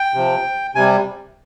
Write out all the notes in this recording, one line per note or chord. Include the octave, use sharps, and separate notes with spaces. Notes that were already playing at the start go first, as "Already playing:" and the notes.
Already playing: G5
C3 F3
C3 G3 G#5